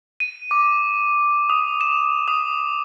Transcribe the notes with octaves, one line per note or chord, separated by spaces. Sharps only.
D#7
D6
D#6
E7
D#6